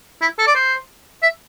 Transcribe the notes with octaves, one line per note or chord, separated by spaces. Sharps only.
E4
A4
D5
C5
E5